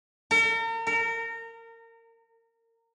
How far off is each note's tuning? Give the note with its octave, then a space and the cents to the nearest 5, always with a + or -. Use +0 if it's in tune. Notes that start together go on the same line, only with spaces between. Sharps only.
A#4 -40
A#4 -25